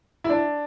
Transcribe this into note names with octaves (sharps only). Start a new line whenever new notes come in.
E4
D4